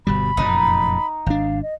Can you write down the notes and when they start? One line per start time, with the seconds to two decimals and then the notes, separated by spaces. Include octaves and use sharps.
0.07 G1 B2 G3 B5
0.37 F1 F#2 A#2 D#4
1.26 G#1 D4 F5
1.62 D#5